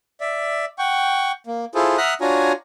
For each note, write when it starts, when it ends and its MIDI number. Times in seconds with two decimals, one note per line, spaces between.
0.21 0.65 74
0.21 0.65 76
0.78 1.32 78
0.78 1.32 79
0.78 1.32 85
1.47 1.65 58
1.75 1.97 64
1.75 1.97 65
1.75 1.97 68
1.75 1.97 69
1.75 1.97 72
1.98 2.14 76
1.98 2.14 78
1.98 2.14 82
1.98 2.14 87
1.98 2.14 89
1.98 2.14 90
2.21 2.52 62
2.21 2.52 65
2.21 2.52 66
2.21 2.52 73
2.21 2.52 80
2.21 2.52 82